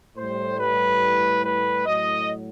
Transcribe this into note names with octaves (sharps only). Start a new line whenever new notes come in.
A2 G3 C5
B4
B4
A2 F#3 D#5